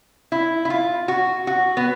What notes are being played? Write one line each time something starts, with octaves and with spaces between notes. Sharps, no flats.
E4
E4
F4
F#4
F#4
B3